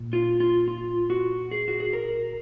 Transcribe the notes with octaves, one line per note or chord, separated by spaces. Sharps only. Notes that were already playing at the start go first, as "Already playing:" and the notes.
Already playing: A#2
F4
F4
F4
F#4
G#4
F#4
G#4
A#4